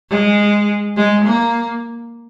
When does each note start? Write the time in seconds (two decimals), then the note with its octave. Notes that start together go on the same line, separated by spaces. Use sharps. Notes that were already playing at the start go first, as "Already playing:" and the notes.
0.10 G#3
0.97 G#3
1.25 A#3